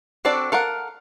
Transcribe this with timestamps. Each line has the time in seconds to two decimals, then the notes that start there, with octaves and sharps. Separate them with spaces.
0.25 C4 D4 F#4 A4 D5
0.52 A4 A#4 F5 F#5